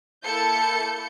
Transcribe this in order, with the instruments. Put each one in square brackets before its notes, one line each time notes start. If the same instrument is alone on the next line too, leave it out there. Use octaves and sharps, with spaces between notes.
[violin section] A#3 E4 A4 A5 G6 C#7